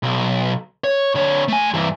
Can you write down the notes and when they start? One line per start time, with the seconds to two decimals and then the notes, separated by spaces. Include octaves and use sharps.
0.03 B1
0.84 C#5
1.15 D3 C#5
1.48 A3 G#5
1.74 G2 E3